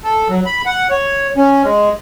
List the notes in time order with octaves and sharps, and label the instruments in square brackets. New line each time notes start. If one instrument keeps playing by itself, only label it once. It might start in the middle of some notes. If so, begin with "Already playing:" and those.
[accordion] A4
F#3
B5
F#5
C#5
C#4
G#3